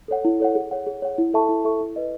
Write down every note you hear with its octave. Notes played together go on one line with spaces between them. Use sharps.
A4 C#5 F#5
E4
A4 C#5 F#5
G#4
C#5 F#5
G#4
C#5 F#5
E4
A4 E5 A5 C#6
E4
A4 E5 A5 C#6
E4
B4 D#5